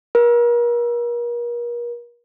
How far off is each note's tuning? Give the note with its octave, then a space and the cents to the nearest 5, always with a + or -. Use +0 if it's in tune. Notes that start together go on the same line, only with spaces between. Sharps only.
A#4 +40